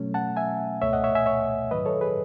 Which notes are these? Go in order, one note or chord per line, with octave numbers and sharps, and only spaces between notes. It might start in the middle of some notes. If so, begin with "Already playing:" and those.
Already playing: B2 F#3 A3 C#4
F#5 A5
E5 G#5
C#2 B2 A3 C#5 E5
D#5 F#5
C#5 E5
E5 G#5
C#5 E5
G#2 D#3 F#3 B4 D#5
A4 C#5
G#4 B4